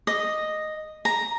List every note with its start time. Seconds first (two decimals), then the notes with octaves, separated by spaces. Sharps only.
0.07 D#5
1.05 A#5